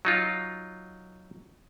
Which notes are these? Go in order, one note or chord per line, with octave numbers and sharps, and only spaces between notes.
F#3 D#4 F4